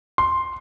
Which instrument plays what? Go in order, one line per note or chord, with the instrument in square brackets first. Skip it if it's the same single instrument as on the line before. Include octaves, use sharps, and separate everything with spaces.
[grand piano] C6